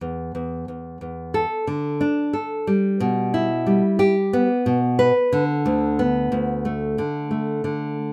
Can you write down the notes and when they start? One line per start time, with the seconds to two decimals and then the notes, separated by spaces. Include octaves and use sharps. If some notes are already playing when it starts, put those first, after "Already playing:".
0.01 E2
0.35 E2
0.68 E2
1.01 E2
1.34 A4
1.67 D3
2.01 D4
2.33 A4
2.67 G3
3.00 B2
3.34 E4
3.66 G3
3.99 G4
4.33 B3
4.66 B2
4.99 B4
5.33 D3
5.66 D2
5.99 B3
6.32 D2
6.65 A3
6.98 D3
7.31 A3
7.64 D3